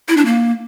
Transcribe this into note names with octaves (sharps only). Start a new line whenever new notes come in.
E4
D4
A#3